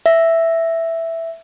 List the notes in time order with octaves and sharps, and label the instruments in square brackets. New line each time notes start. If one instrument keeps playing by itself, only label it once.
[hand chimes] E5